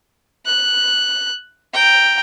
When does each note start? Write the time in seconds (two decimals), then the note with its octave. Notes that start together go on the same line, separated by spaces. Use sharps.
0.46 F#6
1.73 G5 A#5